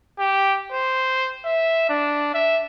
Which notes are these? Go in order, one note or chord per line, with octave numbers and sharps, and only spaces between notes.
G4
C5
E5
D4
E5